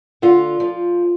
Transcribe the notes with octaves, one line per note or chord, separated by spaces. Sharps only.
D3 F4
F3